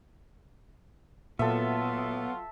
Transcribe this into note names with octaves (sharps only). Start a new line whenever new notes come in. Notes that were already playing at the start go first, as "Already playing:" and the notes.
A#2 F#3 B3 F4 A4 E5